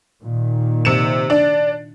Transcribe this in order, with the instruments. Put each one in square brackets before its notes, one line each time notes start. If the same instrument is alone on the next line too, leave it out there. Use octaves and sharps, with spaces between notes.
[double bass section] A#2 D#3
[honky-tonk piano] C3 C#7 E7
[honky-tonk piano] D4 [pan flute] D5